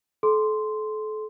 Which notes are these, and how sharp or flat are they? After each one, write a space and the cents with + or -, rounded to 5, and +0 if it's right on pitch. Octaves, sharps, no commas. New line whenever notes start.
A4 -35 C6 -5